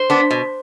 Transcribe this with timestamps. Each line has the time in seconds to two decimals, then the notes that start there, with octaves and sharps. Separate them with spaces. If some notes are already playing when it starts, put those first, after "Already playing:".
Already playing: C5
0.10 B3 D4
0.31 B2